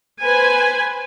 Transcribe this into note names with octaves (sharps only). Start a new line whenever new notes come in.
B4 C5 G#5